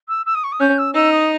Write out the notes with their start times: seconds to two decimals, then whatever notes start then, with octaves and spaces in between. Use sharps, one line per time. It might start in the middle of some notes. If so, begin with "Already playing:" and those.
0.08 E6
0.25 E6
0.34 D#6
0.43 C#6
0.52 D#6
0.60 C#4 G6
0.78 E6
0.94 D#4 E6
1.12 D#6